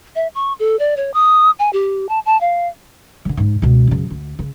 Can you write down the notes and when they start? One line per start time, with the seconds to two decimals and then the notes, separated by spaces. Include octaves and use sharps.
0.15 E5
0.35 C#6
0.59 A4
0.79 D5
0.97 C#5
1.14 D#6
1.59 G#5
1.73 G4
2.09 A5
2.26 A5
2.41 F5
3.25 D3 E3
3.37 G#2 D#4
3.62 C#2 B2
3.87 F#2 C#3
4.10 D2
4.39 C#3